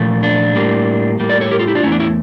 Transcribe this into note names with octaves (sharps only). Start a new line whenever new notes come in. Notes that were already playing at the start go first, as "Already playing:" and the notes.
Already playing: A#2 F3 A3
D4
A2 G3 A#3
A2 G3 A#3
A#4 D5
A4 C#5
G4 A#4
F4 A4
E4 G4
D4 F4
E2 D3 A3 C#4 E4
D4
C#4 E4